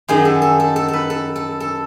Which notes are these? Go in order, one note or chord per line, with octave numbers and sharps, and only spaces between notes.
F#2 D#3 F#3 G#4
A4
A4
A4
A4
A4 B4
A4
A4
A4